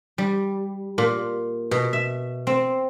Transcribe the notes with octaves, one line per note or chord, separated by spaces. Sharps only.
G3
A#2
B2
E5
C4